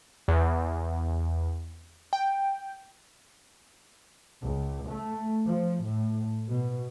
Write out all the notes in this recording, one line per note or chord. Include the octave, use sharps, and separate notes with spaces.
E2
G5
C#2
A3
F3
A2
B2